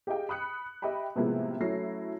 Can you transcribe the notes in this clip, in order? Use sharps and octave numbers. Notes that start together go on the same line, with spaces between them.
G4 G#4 D#5 F5 G5
B5 D#6 F#6 C#7
G4 D#5 E5 G5 B5
A2 C3 F3 G#3 A#3 B3
F#3 A3 C#4 E4 A#6 C7